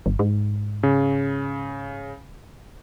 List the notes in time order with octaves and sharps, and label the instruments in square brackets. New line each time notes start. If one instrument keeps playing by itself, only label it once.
[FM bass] G1
G#2
[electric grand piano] C#3